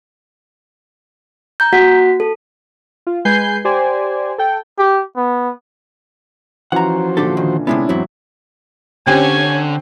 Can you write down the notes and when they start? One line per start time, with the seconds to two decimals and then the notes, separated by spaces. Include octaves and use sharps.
1.60 A#5 G6
1.73 A#3 F#4 F#5 B6
2.20 A4
3.07 F4
3.25 G#3 B4 G#5 G6 C7
3.65 G4 C5 D5 G#5
4.38 A4 G5
4.78 G4
5.17 B3
6.72 E3 F3 C#4 F#4 C5 F#5 A#5
7.17 A#2 D3 D4 G4 A4
7.37 D#3
7.67 C3 G#3 B3 C#4 D4 E4
7.89 E2 G#2 F#3 C4 E4
9.07 D3 C4 C#4 G4 G#5